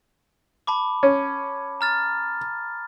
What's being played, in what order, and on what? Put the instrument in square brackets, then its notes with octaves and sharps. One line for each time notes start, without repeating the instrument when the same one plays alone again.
[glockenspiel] A5 B5 D6
[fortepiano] C#4
[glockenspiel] A#5 F6 A6